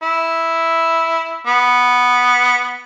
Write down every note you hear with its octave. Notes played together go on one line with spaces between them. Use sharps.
E4
B3